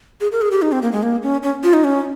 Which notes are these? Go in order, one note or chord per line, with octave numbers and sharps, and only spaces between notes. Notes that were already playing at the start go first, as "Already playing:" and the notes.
G#4
A#4
G#4
G4
D#4
C4
A#3
G#3
A#3
C#4
C#4
F4
D#4
C#4